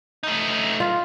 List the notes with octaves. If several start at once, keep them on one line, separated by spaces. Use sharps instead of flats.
A3 D#4
F4